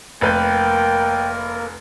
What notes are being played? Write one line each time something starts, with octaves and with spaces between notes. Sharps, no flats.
F1 A#3 A#4 B4 G5 G6